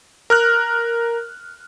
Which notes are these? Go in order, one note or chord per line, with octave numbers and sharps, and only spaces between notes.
A#4 F6 F#6